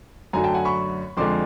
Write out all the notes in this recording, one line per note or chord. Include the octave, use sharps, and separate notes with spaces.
F#2 D3 F#3 A3 G#5 A#5
G5 A5
F#5 G#5
B5 C#6
F2 D3 F3 G#3 C6 D6